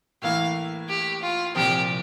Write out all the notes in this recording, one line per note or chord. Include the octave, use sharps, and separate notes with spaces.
A2 E3 A#3 E4 F5
G4
F4
C2 A#2 F3 C4 G4